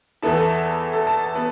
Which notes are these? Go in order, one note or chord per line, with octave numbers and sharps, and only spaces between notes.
E2 E3 B3 E4 A4
A4
A4
A5
B3